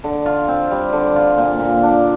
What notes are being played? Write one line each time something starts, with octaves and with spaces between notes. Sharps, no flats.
D3
F4
C4
G3
D3
F4
A#2
A#2
D4